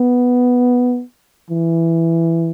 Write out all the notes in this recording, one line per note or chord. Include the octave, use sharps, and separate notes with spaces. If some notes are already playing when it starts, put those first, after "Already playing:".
Already playing: B3
E3